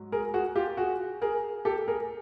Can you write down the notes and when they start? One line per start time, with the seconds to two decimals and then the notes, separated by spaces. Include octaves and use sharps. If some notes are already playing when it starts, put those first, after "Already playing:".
Already playing: G#2 F#3
0.12 G#4 A#4
0.34 F#4 G#4
0.56 F4 G4
0.77 F#4 G#4
1.22 G#4 A#4
1.65 G4 A4
1.88 G#4 A#4